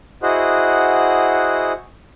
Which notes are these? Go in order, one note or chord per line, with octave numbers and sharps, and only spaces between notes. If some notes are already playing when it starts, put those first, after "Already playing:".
E4 F#4 G#4 C5 D#5 F#5